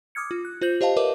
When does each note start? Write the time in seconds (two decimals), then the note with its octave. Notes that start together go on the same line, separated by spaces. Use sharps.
0.15 D6 D#6 F6 G#6 C#7
0.31 F4
0.45 F#6
0.62 F4 C5 G6 F#7
0.81 G4 C5 D#5 F5 A5
0.97 A#4 B4 C#5 D#5 E5 D6